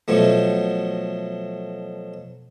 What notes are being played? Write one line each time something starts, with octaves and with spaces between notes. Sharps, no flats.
B2 F3 F#3 A3